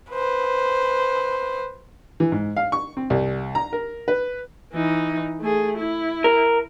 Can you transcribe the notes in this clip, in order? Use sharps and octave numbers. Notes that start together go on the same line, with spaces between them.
B4 C5
E3
G#2
F5
C#6
C4
C2
A#5
A#4
B4
E3 D#4
A3 G#4
E4
A#4